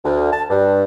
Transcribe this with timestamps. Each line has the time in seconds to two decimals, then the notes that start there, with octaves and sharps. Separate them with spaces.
0.04 D2
0.31 A5
0.50 G2